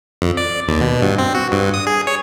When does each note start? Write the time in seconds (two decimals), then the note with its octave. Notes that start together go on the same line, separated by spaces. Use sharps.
0.22 F2
0.37 D5
0.68 D#2
0.81 B2
1.02 G2
1.18 C4
1.35 F#4
1.52 G2
1.74 D#6
1.87 G#4
2.07 C#5